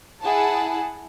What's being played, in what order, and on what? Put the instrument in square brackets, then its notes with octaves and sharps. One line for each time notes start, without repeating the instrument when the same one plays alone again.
[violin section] E4 G#4 F#5 A5